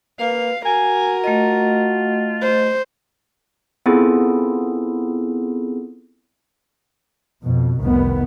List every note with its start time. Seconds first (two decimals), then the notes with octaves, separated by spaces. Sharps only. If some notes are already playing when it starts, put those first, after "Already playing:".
0.20 A#3 B4 F5
0.66 F#4 A#4 G#5
1.24 A3 F4 D#5
2.42 C5
3.86 B3 C4 E4 F4 G#4 A4
7.44 F2 B2
7.82 F1 C2 D#3 B3